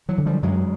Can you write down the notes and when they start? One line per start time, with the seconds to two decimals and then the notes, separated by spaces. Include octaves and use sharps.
0.09 E3 F#3
0.18 D3
0.26 F3 G3
0.43 F#2 F#3 G#3